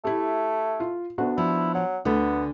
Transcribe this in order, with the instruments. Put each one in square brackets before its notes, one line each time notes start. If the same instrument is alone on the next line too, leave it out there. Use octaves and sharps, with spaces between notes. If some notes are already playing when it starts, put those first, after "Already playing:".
[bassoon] A3 [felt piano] E4 G4
[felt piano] F4
[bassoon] D2 [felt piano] B3 D4 F#4
[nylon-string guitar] F3 [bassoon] E4
[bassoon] F#3
[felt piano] D2 [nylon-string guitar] D3 A3 [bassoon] B3